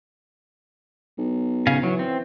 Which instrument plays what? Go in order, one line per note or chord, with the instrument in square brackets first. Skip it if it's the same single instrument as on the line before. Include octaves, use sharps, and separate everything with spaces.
[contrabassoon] B1
[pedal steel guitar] C#3 F5 G#5
[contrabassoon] E3 [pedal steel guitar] F#3
[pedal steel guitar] C4